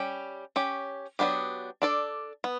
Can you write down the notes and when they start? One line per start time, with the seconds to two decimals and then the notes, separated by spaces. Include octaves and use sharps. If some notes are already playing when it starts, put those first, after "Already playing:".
Already playing: G3 C#4 G4
0.56 C#4 G4 C#5
1.19 F#3 B3 D4 G4
1.82 D4 A4 D5
2.44 B3